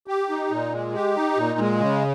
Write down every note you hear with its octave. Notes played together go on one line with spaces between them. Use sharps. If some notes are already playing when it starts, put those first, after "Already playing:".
G4
D#4
A#2
G#3
G4
D#4
A#2
G#3
C#3